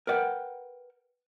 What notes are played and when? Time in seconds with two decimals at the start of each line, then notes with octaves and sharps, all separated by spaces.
0.07 A#4 B4 D5 F#5 G5